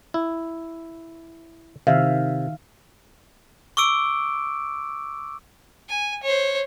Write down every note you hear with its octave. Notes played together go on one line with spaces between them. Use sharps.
E4
C3 D#3 E5 F5
C#6 D6 E6 D7
G#5
C5 C#5